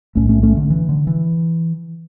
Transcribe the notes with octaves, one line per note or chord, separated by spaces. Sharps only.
B1 A2 A3 C#4
A3 C#4
A3 C#4
D3
E3
D3
E3